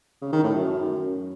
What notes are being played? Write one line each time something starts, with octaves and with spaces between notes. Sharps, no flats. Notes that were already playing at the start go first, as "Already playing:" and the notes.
C#3
D#3
A2
F#2